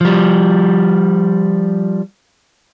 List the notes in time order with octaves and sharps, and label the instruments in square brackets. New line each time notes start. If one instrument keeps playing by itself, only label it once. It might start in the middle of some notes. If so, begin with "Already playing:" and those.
[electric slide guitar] F3 G3